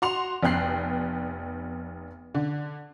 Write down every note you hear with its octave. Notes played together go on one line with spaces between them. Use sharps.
F#4 C6 F7
F1 B3 G5 F#6 C7
D3